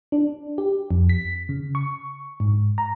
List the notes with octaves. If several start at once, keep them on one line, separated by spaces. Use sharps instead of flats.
D4
G4
F2
B6
C#3
C#6
G#2
A#5